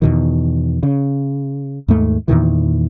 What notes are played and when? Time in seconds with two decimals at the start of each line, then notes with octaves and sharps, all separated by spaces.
0.02 E2 B2 D#3
0.83 C#3
1.88 D#2 G#2 A3
2.28 E2 A#2 D#3 E3